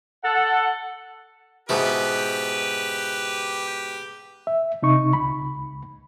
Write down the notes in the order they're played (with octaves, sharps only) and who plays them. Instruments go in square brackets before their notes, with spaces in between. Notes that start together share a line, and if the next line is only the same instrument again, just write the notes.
[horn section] A4 F#5
[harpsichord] G#2 B2 E4 [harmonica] G4 B4
[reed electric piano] E5
C3 D#4 C#6
C#2 B5